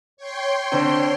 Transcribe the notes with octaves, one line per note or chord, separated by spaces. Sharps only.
C#5 G5 C6
D3 C4